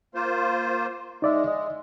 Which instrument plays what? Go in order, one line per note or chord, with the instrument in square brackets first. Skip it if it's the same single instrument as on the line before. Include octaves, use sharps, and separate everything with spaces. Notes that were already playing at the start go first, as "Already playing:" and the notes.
[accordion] A#3 F4 C5
[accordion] G#3 [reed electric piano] D#4 D5 E5
[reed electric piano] D#5